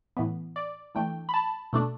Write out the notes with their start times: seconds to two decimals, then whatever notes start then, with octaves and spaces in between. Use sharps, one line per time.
0.17 A2 E3 B3
0.56 D5
0.95 E3 A3 D4 G5
1.29 B5
1.34 A5
1.73 B2 A3 D4